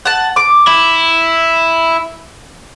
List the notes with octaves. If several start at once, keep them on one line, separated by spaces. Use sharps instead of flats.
F#5 A5
D6
E4